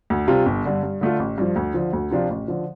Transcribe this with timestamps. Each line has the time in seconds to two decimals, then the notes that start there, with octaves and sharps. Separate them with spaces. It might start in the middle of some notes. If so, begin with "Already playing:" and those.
0.10 D2
0.28 C3 G3 F4
0.46 G1
0.65 G2 D3
0.83 G2
1.01 D3 A3 F4
1.20 A1
1.38 G2 F3
1.56 D2
1.74 D3 F3
1.93 D2
2.11 C3 F3 D4 F4
2.30 A1
2.48 D3 F3